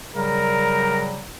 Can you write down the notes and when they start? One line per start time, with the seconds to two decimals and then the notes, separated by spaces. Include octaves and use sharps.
0.16 C#3 F#3 G3 A#4